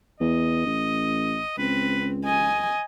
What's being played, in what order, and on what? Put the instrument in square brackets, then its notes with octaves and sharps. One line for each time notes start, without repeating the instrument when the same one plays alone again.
[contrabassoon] E2 [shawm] D#5
[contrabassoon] A1
[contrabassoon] C#2 [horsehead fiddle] C4 [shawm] B4
[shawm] D#5 [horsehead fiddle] G#5